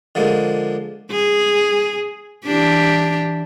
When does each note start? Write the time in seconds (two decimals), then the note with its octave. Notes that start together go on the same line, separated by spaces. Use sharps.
0.15 D3 F3 G#3 A#3
1.11 G#4
2.46 E3 D4 G4